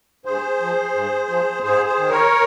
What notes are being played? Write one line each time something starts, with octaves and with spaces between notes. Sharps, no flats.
G2 G#4 C5
F3
G2
F3
G#2 G#4 C5
G#4 C5
D#3
A#4 C#5